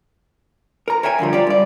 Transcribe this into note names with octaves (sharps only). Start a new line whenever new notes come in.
A#4 A#5
A#4 C#5 E5 G5 G#5
F2 D3 F3 G3
F4 G4 D5
G2 D5